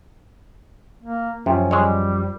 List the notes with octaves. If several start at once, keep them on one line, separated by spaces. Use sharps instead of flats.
A#3
F#2 C3 F3 C#4
G3 G#3 C#5